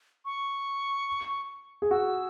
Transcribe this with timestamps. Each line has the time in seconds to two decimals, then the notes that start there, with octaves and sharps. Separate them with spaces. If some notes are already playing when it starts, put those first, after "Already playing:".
0.25 C#6
1.82 G#4
1.91 F#4 E6